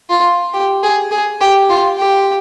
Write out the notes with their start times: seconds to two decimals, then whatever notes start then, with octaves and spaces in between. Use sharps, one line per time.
0.10 F4
0.54 G4
0.83 G#4
1.11 G#4
1.41 G4
1.69 F4
1.98 G4